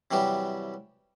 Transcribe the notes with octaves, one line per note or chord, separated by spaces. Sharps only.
C3 E3 F#3 G3 G4